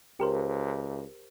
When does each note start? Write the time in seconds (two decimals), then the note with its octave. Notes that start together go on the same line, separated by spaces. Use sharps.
0.20 C#2 G4 A#4 C5